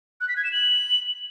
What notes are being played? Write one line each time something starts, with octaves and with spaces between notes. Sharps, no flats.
F#6
B6
G#6
E7
F#7